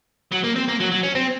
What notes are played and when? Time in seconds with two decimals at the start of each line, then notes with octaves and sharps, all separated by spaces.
0.32 F#3
0.44 A#3
0.55 C4
0.68 A#3
0.80 F#3
0.91 F#3
1.03 C#4
1.15 C4